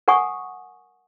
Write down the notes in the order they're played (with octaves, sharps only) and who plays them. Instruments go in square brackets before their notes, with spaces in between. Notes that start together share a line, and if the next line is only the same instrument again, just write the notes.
[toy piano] A#4 F#5 G#5 C#6 D#6